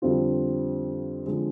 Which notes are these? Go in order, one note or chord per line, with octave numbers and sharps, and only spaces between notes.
F2 D3 G3 C4 F4
D3 F3 G#3 C4